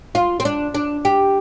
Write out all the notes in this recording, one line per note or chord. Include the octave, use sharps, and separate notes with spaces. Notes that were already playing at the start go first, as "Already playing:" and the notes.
F4
C4
D4
D4
G4